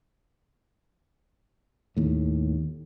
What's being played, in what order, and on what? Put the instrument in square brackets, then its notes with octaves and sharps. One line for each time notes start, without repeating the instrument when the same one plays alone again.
[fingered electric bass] D#2 A2